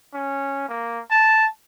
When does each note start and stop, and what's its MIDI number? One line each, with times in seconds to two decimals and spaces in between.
0.14 0.66 61
0.69 1.00 58
1.11 1.46 81